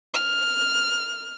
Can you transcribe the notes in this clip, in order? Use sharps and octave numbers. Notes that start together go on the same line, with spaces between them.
F6